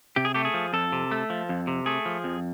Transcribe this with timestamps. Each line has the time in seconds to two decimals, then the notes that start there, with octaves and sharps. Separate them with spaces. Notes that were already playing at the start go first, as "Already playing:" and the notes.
0.16 C3 G4
0.25 G#4
0.34 A3 G4
0.45 G#4
0.54 F3
0.73 F2 A4
0.92 C3
1.11 A3
1.30 F3
1.49 F2
1.67 C3
1.86 A3 G#4
2.06 F3
2.24 F2